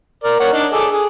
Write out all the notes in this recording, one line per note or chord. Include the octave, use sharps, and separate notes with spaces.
A#4 D5
A#3 C#5 F#5
D4 D#4
G#4 A4 D6
G#4